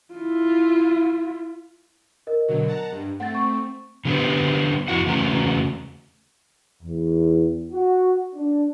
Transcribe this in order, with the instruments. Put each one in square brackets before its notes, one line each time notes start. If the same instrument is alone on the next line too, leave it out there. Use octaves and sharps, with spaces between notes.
[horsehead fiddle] E4 F4
[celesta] A#4 D#5
[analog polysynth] B2 D3 F#3
F#5 A5 A#5
G2
[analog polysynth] A3 C4 [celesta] F#5 A6
[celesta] C#6
[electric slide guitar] D3 G3 A3 B3 G4 C5
F2 E4 F#4 F#5
E2 C#3 A3 C#4 F#4 A#5
[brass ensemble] E2
F#4
D4